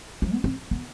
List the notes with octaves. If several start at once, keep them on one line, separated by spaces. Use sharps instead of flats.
F3
B3
C4
B3